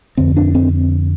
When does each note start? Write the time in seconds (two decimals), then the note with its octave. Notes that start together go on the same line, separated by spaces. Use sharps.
0.17 F2 D3 C4
0.37 D4
0.55 C4